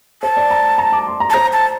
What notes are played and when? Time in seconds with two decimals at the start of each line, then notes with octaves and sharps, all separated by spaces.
0.23 C5 A5
0.37 D5
0.51 A#5
0.78 A#5
0.92 D6
1.07 C6
1.20 A#5
1.30 A5
1.34 C5 A#5
1.53 A5